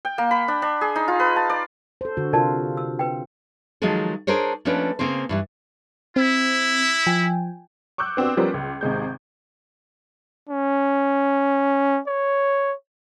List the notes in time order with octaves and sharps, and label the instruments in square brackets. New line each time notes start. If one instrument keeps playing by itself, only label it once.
[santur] G5
A#3
B5
D4
D4
G#4
D#4
F4
B4
A5
D5
[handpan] A4 C5
D3 F#4
[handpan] C3 F4 [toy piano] A#4 D5 A5
[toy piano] E6
B4 G5
[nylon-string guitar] D#3 F3 F#3 G#3 G#4 A4
D4 G#4 A#4 C5 C#5
F3 A3 A#3 C#4 D4 B4
C#3 A#3 C4 C5
G2 E3 G3
[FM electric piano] C4 [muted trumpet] E4
[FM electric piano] F3 G5 G#5
[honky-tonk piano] C#6 D6 E6 F#6 G6
B3 C4 D4 F#4 G4
F3 G3 B3 C#4 A#4 C5
C#2
G#1 C3 G#3 G6
[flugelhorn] C#4
C#5